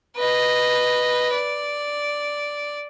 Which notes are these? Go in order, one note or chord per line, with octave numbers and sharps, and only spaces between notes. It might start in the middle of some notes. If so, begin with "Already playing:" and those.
B4 D#5
D5